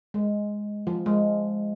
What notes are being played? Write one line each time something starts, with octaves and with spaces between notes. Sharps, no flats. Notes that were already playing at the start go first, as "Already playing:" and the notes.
G#3
F3
G#3